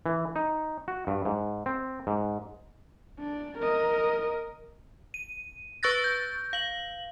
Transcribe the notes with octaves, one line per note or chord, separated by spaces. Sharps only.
E3
D#4
F#4
G2
G#2
C4
G#2
D4
A#4 D#5
D#7
B4 C#6 E6 F#6 A6 A#6
G6
F5 F#7